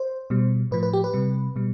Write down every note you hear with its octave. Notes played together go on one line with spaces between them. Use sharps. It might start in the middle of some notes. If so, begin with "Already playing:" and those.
Already playing: C5
B2 G3
A2 F3 B4
B4
G4
B4
C3 G3
B2 G3